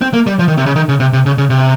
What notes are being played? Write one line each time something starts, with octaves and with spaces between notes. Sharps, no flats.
C4
A#3
G3
F3
D#3
C3
C#3
D#3
C#3
C3
C3
C#3
C#3
C3